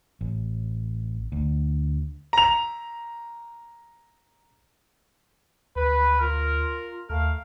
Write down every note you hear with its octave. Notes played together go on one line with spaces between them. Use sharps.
A1
D2
A#5 F7
D2 B4
F4 A#4
D#2 A3 A#4 F5